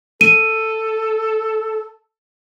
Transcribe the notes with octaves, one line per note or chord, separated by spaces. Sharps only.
A4 D#7